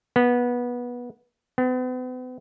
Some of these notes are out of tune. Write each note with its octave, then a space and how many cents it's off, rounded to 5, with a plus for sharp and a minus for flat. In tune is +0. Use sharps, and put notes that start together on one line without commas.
B3 -20
B3 +40